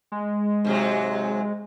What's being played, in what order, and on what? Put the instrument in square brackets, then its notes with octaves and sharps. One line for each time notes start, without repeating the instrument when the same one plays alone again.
[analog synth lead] G#3
[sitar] G#2 C3 F#3